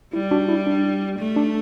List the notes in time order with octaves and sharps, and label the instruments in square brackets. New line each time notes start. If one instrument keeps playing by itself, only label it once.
[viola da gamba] G3 [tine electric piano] E4
[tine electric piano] D4 F#4
E4
D4
[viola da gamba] A3
[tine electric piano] D4